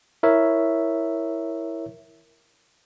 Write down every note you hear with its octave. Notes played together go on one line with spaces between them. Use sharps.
E4 A#4 C#5 E5